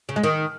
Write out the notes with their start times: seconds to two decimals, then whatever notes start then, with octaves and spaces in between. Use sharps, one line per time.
0.09 C#3
0.16 G#3
0.24 D#3